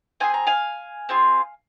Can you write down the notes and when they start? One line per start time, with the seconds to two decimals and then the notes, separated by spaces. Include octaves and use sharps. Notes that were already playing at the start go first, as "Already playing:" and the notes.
0.20 C4 F4 G#4 G#5
0.34 A#5
0.47 F5 G#5
1.09 C4 F4 G#4